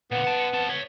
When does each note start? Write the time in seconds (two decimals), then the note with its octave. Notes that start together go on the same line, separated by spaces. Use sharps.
0.11 A#2 D3 B3
0.24 F#5 A5
0.53 C4 A5
0.69 C#5 E5